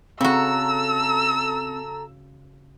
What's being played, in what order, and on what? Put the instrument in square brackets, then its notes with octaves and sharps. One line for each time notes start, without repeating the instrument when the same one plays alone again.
[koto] C#3 F#4 [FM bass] C4 [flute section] A4 A#5 [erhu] E6